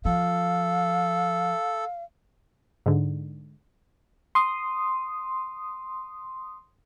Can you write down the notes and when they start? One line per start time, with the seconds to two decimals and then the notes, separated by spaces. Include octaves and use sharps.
0.05 F3 A4 F5
2.86 G#2 D3
4.35 C6 D#6